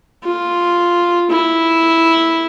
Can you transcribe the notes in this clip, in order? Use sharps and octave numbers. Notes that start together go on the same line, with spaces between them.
F4
E4